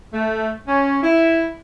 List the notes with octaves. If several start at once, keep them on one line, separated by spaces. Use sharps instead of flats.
A3
C#4
E4